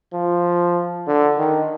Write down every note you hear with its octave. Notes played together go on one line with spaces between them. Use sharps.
F3
D3
D#3